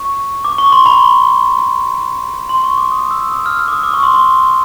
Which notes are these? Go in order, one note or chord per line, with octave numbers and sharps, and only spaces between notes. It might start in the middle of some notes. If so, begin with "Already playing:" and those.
Already playing: C#6
D6
C#6
C6
B5
C6
C#6
D6
D#6
E6
D#6
F6
E6
D6
D#6
D6
C#6
C6
C6